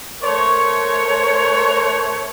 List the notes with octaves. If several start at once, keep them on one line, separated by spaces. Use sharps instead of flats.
A3 A#4 C5 C#5